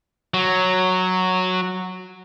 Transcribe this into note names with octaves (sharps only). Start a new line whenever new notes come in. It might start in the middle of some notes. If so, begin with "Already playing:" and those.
F#3